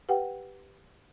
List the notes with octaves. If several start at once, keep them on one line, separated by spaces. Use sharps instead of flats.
G4 B4 F#5 G5